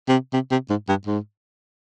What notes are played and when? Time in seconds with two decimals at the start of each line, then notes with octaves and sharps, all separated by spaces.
0.09 C3
0.33 C3
0.51 C3
0.70 G#2
0.88 G2
1.06 G#2